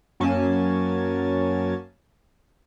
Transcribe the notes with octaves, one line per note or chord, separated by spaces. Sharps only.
F#2 F#3 A#3 C#4 G#5 A5